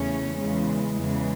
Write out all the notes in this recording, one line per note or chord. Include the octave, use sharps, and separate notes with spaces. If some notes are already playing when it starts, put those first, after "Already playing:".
Already playing: E2 C#3 E3 A3 C#4
E2 C#3 E3 G#3
E2 C#3 E3 G#3